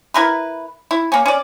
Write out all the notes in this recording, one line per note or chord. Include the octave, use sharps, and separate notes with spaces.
E4 A#4 B4
E4
A#3 C#4
C#4 D5